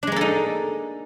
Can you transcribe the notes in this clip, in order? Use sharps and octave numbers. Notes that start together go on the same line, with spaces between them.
G#3 A#3 D4 D#4 A4